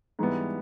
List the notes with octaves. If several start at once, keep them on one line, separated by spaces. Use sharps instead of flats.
G#2 E3 G3 B3